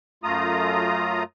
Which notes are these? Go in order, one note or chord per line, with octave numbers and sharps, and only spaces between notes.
F#2 A3 F4 A#5 D#6